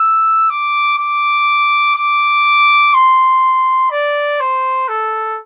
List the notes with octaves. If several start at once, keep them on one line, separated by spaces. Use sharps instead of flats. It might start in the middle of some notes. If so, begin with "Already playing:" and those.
Already playing: E6
D6
D6
D6
C6
D5
C5
A4